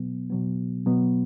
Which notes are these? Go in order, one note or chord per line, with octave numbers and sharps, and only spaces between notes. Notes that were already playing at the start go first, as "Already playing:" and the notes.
Already playing: B2 F#3 B3
B2 F#3 B3
B2 F#3 B3